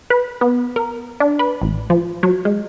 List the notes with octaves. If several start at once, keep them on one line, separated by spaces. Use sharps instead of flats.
B4
B3
A#4
D4
B4
A1
F3
F#3
G#3